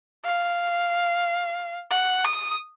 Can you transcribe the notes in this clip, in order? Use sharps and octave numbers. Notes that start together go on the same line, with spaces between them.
F5
F#5
D#6